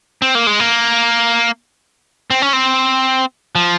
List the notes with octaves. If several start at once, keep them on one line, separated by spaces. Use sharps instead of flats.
C4
A#3
G#3
A#3
C4
C#4
C4
F3